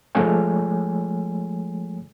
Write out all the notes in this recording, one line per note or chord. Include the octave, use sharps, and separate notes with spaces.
F3 G#3 A3 C#5 G#5